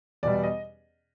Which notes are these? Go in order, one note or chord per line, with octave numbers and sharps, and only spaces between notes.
E2 B2 G3 D5
D#5